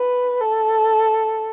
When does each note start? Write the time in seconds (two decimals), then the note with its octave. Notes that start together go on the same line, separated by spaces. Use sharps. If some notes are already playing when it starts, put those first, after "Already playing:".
Already playing: B4
0.40 A4